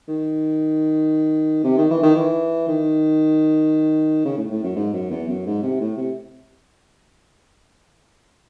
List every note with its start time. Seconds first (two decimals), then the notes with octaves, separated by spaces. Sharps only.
0.08 D#3
1.64 C3
1.77 D#3
1.90 E3
2.03 D#3
2.16 E3
2.68 D#3
4.25 C#3
4.37 A2
4.50 A2
4.63 F#2
4.76 G#2
4.93 F#2
5.10 E2
5.28 F#2
5.46 G#2
5.62 C3
5.80 A2
5.97 C3